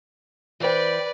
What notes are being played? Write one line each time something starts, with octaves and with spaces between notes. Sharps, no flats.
E3 B4 C5 D5 G5